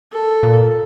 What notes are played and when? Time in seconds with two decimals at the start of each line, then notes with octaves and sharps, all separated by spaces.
0.12 A4
0.43 A#2